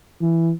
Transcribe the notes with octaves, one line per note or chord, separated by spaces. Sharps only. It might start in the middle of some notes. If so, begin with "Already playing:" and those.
E3